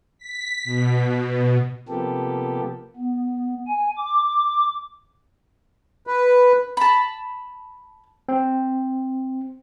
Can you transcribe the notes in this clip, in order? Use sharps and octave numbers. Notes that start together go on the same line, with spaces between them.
B6
B2
C3 F3 A#3 B3 G4 A4
B3
G#5
D6
B4
A5 B5
C4